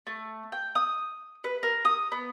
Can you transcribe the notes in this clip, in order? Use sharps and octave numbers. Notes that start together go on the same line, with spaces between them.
A3
G5
D#6
B4
A#4
D#6
B3